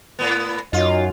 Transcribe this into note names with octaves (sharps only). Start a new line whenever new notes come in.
A2 B3
F#2 D#4 F4 F#4 C#5 D#5